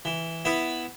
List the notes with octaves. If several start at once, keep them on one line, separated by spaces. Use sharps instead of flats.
E3
B3 E4 B4